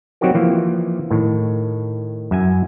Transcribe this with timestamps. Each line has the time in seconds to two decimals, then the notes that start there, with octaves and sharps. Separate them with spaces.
0.21 F#3 C4 D#4 F#4 G4 A#4
0.34 E3 F3 A#3
1.10 A2 D#3
2.31 F#2 E5 G#5